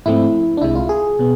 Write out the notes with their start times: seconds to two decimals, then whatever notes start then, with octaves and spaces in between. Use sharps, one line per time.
0.06 G#2 F3 A3 C4 E4
0.57 D4
0.62 C2 C3 G#3 E4
0.75 F4
0.89 G#4
1.19 B2 B3